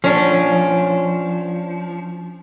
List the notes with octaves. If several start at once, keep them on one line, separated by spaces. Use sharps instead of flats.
F3 C#4 D4